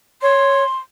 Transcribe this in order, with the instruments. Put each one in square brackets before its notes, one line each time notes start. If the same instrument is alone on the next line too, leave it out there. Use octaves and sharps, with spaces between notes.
[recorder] C#5 [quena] C6